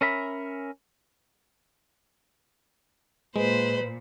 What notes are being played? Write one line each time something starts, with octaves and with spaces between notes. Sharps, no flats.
C#4 A#4 E5 B5
A#2 G#3 B4 C5 B5